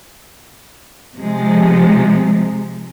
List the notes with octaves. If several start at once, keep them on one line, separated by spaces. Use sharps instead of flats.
C3 F3 G#3